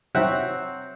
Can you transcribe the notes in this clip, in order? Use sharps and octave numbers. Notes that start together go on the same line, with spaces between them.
C3 F#3 C4 F#4 E5 F#5